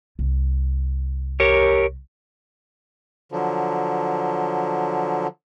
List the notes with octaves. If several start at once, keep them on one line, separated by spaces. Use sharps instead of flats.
C2
G4 A#4 C#5
D3 F3 F#3